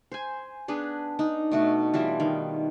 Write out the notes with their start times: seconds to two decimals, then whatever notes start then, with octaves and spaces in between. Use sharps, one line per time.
0.12 C5 G#5
0.68 B3 D4 G#4 B4
1.19 D4 D#4
1.52 B2 A3 F#4
1.94 E3 G3 F4 E5
2.20 D#3